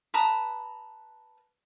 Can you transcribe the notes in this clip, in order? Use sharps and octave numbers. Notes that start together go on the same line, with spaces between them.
B4 A5 A#5 D#6